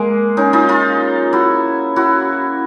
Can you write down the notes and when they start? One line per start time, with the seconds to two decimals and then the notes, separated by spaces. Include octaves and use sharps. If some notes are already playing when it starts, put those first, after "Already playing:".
Already playing: G#3 A#3
0.37 C#4 D#4
0.53 D#4 F4
0.69 D#4 F4
1.33 E4 F#4
1.96 E4 F#4